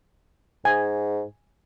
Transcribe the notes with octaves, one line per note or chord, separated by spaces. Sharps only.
G#2 G#5